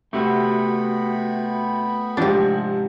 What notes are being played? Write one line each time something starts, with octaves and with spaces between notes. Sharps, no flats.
C3 A3 B3 F#4 G5 B5
G#2 C3 F3 D4 G4